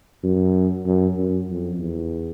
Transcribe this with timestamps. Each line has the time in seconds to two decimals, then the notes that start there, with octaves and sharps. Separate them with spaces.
0.24 F#2
0.86 F#2
1.16 F#2
1.49 F2
1.79 E2